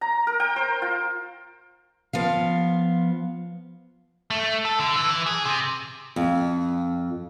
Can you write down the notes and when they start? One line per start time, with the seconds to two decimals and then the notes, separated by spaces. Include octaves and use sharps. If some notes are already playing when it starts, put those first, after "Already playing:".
0.01 A#5
0.27 A#4
0.40 G5
0.56 C5
0.82 F4
2.13 F3 B3 F5
4.30 A3
4.65 A4
4.80 D3
4.96 E3
5.11 E3
5.26 G#4
5.45 C3
6.16 F2